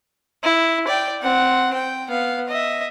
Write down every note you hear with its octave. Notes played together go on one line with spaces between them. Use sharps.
E4
D5 G5
C4 F#5
G5
B3 F5
D#5 E5